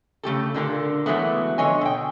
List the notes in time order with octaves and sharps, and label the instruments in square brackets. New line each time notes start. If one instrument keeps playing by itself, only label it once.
[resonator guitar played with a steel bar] C#3 A3 G4 A4
A#2 D3 A#3 D4
E3 F#3 G#3 A3 B3
D3 F3 C#5 D#5 G#5
B2 G5